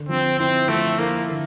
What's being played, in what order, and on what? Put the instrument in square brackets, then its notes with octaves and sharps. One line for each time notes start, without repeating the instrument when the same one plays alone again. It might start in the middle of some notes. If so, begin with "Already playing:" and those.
Already playing: [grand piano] D3
[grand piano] F3 [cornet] C4
[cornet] C4 [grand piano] E4
[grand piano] F3 [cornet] A3
[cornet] A#3 [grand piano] E4
[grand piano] D3